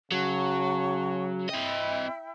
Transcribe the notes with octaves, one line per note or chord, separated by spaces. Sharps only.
C#3 F#3 F#5 A5 C#6
C4 E4 D#5 E5 G5